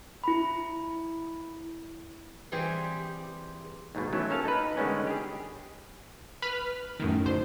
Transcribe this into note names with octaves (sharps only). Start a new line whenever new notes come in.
E4 B5
E3 G3 C4 G4 G#4
D#2 G#2 B2
E3 F#3 A3 B3 C#4
A#3 C#4 A4 F5 A5
D#4 B4
D3 D#3 G3 G#3 B3 C#4
G4 G#4
B4 B5 F6
F#2 A2 D#3
D2 C5